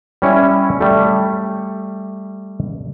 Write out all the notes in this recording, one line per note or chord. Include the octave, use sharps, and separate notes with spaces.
G3 C#4 E4
G3 A3